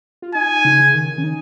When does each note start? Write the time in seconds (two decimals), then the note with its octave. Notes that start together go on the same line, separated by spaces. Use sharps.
0.22 F4
0.35 D#4 G#5
0.65 C#3
0.95 D#3
1.18 C#4
1.24 D#4